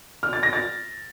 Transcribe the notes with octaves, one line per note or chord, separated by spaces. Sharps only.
F6
A6
A#6
A6